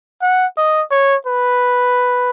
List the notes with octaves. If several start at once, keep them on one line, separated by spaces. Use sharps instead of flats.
F#5
D#5
C#5
B4